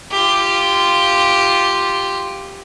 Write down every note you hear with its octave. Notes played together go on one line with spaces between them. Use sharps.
F4 G4